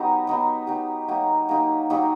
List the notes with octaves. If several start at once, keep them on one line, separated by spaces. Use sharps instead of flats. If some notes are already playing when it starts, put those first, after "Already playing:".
Already playing: F#3 B3 D#4 G4
F#3 B3 D#4 G4
F#3 B3 D#4 G4
F#3 A#3 D#4 G4
F#3 A#3 D#4 G4
F#3 A#3 D#4 G4